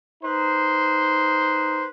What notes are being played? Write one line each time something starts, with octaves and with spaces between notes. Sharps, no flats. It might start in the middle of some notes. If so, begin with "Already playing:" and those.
D#4 B4 C5